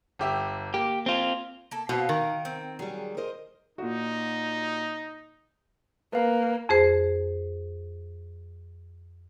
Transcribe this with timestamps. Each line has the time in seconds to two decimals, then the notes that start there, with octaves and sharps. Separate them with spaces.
0.19 G1 G4 E5
0.74 A#3 G4
1.06 C4 F4
1.71 A#3 A4
1.89 B2 C4 F#4 F5
2.09 D#3 A#4
2.45 C4
2.79 F#3 G3 G#4
3.17 A#4 C5 D#5
3.78 A#2 D#4 F#4
6.13 A#3 B4 F5
6.69 F2 G#4 C5